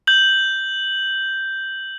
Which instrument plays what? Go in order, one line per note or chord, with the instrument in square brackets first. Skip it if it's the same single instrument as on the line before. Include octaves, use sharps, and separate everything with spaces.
[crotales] G6 F#7